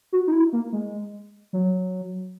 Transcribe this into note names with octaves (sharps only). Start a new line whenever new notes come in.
F#4
D#4
E4
A#3
G#3
F#3